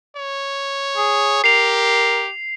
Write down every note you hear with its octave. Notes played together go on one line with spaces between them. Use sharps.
C#5
G#4
G4 A#4 C7 F7